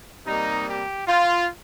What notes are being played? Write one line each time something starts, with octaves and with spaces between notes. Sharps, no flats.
C3 G3 A#3 D#4
G4
F4